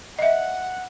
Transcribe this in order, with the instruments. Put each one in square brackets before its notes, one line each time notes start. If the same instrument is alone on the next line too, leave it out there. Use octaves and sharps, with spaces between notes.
[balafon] D#5 E5 [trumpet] F#5